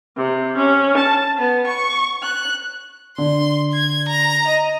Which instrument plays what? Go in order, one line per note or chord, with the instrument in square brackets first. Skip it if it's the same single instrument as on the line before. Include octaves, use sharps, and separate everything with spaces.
[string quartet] C3
C#4
A5
B3
C#6
F#6
[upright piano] D3 [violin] C6
[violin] G#6
A#5
[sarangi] D#5